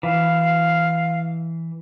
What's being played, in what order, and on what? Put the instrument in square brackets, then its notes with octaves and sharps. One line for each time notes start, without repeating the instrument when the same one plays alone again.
[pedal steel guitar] E3 [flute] F5